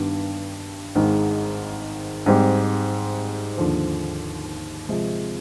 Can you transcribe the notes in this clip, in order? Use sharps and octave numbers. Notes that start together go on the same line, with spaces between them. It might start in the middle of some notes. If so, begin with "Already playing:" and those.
Already playing: G2 D#3 B3 D4 G4
G#1 G#2 D#3 G#3
G#2 G3 C4 G4
D#2 D3 F3
C3 F3 G#3